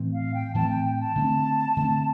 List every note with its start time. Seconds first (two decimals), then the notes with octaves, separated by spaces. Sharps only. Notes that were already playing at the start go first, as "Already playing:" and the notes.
Already playing: A2 E3 A3 C4
0.13 F5
0.34 G5
0.55 A2 E3 A3 C4 A5
0.69 G5
0.85 G5
1.00 A5
1.16 D3 A3 C4
1.77 D3 A3 C4